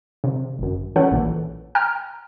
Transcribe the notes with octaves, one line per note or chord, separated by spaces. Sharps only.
C3
G1 F#2
E3 C#4 A4 B4 F#5
A#1 E3
G5 A#5 F6